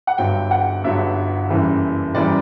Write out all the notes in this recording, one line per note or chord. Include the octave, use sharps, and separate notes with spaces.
F#5
G1 G2 F#3 G5
F#5
G1 G2 F#3 E5
F#1 F#2 E3 G3
F#1 F#2 E3 G3 D5